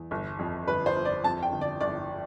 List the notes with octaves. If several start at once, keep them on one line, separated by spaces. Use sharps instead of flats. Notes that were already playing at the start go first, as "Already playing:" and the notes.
Already playing: E2
G1
F2
G1 B4
C5
G1
D5
F2 A5
G5
G1
D5
G1 D5